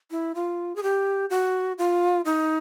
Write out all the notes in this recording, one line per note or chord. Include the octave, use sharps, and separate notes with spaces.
E4
F4
G#4
G4
F#4
F4
D#4